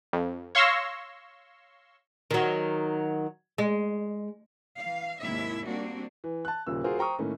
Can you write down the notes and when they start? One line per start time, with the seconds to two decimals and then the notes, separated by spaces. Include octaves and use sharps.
0.13 F2
0.55 C#5 F5 C6 C#6 E6 A#6
2.31 D#3 F#3
3.58 G#3
4.78 E3 F5
5.21 D#2 G#2 C3 A#3 E4 E5
5.63 G3 A#3 C4 D4 F#4
6.24 E3
6.45 A5 F#6
6.67 D#1 A#2 C#3 E6
6.84 F4 F#4 G#4 A#4 C5
6.98 C5 G5 A#5 C#6 D#6
7.19 A2 D#3 A3 A#3 C#4